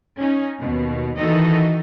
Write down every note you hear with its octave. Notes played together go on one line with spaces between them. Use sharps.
C#4 D#4
D#2 B2
D#3 E3 D#4 F#4 A4 D#5